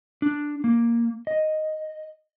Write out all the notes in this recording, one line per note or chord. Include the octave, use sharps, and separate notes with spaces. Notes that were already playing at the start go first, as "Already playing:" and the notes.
D4
A#3
D#5